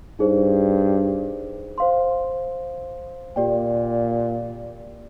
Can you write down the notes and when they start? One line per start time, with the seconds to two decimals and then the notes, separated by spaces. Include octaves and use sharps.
0.19 G2 D#4 G#4 C5
1.78 C5 F5 C6
3.36 A#2 G4 D5 G5